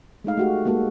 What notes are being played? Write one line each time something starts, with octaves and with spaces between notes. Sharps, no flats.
G#3 A3 D#4 F5
A3 F#4 G4
G#3 A#3 F#4 A4